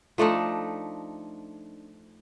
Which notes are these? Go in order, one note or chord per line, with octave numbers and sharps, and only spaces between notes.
F3 A3 D4 D#4